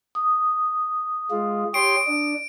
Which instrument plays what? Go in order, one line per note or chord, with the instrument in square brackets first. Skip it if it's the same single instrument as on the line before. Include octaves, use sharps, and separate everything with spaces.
[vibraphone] D#6
[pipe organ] G#3 F4
[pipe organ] G4 C#5 C6 [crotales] D7
[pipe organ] D4